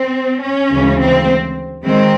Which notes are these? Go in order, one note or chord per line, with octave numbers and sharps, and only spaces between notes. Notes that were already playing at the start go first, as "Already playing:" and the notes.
Already playing: C4
C#4
D2 C#3 E3 G#3
C4
D#3 G#3 C4